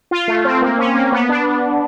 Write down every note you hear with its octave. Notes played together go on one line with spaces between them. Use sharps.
F4
A3
C4
A#3
C#4
A#3
B3
D4
D4